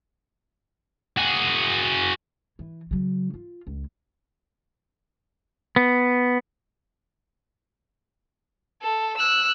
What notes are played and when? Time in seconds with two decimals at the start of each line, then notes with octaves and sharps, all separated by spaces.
1.17 F#4 G#4
2.59 E3
2.91 C#3 F#3
3.34 F4
3.67 C#2
5.76 B3
8.82 A4
9.17 E6 F#6